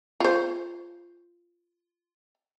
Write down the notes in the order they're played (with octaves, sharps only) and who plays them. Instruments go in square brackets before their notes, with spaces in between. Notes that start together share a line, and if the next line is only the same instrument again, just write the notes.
[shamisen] F4 C5